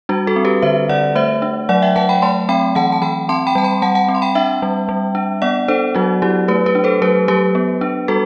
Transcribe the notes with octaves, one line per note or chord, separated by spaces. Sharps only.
G3 D4 F#4
F#4 A4
C4
G4 B4
D3 C5 E5
D3 D5 F#5
A3 C5 E5
D4
F#3 D5 F#5
E5 G5
F#3 F#5 A5
G5 B5
A3 A5 C6
C4 G5 B5
E3 F#5 A5
A5
E3 G5 B5
C4 A5 C6
G5 B5
G3 A5
G5 B5
G3 F#5 A5
F#5 A5
C4
C6
G5 B5
D4 E5 G5
G3
G3
D4
B3 D5 F#5
D4 A4 C5
F#3 D4 F#4
F#3 E4 G4
A3 G4 B4
G4 B4
D4
A4 C5
F#3 G4 B4
F#3 G4 B4
B3
D4
G3 F#4 A4